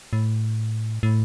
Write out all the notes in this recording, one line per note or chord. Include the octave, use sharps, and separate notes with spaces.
A2
A2